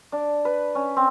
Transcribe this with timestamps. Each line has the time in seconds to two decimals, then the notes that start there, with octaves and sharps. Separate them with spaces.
0.12 D4
0.45 B4
0.75 C#4
0.96 C4